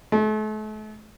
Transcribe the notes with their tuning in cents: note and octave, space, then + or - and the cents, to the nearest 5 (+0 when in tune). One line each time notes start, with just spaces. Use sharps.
A3 -40